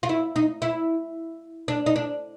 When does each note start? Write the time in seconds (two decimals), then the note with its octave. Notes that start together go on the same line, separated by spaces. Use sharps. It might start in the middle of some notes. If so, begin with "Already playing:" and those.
0.03 F4
0.09 E4
0.36 D#4
0.62 E4
1.68 D4
1.86 D#4
1.96 D4